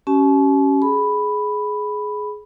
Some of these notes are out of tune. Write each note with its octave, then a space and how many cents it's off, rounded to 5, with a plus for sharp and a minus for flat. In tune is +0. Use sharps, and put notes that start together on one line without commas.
C#4 +0 G4 -40 A5 -45
G#4 +15 B5 +0